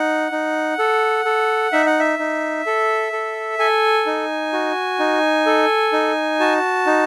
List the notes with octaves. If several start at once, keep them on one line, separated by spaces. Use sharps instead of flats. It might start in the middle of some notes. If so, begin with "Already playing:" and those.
Already playing: D#4 F#5
D#4
A4
A4
D#4 E5
F#5
E5
D#4
A4
A4
A4 G#5
D#4
F#4
D#4
A4
D#4
F#4 A5
D#4